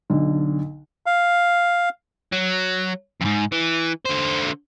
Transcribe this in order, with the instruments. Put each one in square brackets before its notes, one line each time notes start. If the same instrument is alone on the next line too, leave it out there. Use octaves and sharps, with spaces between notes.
[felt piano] B1 D3
[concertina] F5
[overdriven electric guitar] F#3
F2 G#2
E3
D3 C5